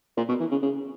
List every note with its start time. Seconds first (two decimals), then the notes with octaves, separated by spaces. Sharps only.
0.17 A#2
0.29 B2
0.40 E3
0.51 C#3
0.62 C#3